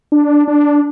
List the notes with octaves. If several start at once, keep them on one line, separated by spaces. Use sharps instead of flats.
D4
D4